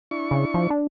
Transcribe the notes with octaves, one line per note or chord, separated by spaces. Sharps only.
D4 E4 C#6
C#3
F3
D4